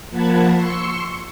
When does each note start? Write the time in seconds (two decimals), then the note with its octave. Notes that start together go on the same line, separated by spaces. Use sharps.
0.10 F3 A#3 F#5 A5 B5 G#6
0.55 C6 C#6 E6 C#7